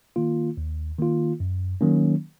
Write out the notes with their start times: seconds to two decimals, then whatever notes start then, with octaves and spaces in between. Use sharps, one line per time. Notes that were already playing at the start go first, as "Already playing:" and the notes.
0.16 D#3 A#3 F4
0.57 D#2
0.99 D#3 A#3 F4
1.40 F#2
1.81 D#3 F#3 A#3 C#4